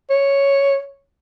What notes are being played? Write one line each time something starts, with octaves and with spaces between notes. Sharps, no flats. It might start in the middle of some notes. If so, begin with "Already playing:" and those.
C#5